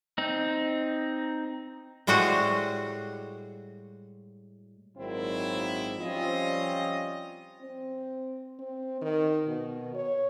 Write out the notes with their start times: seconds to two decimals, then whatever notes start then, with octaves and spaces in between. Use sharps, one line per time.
0.18 C4 D#4
2.07 A2 G3 G#3 F#4 C5 F#5
4.97 G#1 A#2 D#3 F#3 C4 E4
5.99 F3 G3 C4 C#4 F4 D#5
7.61 C4
8.59 C4
9.01 D#3
9.48 B2
9.95 C#5